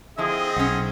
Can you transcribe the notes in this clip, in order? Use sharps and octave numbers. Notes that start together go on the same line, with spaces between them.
D3 F3 C4 E4 G#4 D#5
B1 C#4 F#5